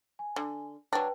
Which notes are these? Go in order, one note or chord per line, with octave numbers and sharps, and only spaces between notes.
G#5
D3
F#3 D4 B4 G5 A5